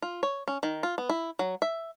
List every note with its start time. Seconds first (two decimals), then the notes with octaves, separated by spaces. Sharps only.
0.02 F4
0.23 C#5
0.48 C#4
0.63 D#3
0.83 F4
0.98 B3
1.09 E4
1.39 F#3
1.62 E5